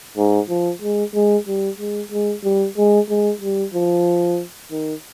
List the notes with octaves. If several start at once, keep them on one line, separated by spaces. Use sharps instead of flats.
G#2
F3
G#3
G#3
G3
G#3
G#3
G3
G#3
G#3
G3
F3
D#3